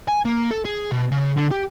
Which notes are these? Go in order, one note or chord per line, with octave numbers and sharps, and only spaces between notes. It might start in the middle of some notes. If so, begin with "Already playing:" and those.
G#5
A#3
A4
G#4
B2
C#3
D3
G4